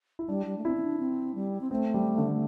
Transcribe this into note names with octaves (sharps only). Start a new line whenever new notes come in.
E4
G3 D4
G3
A3
C4 E4
C4
D4
C4
G3
C4
A3 C4
G3
D3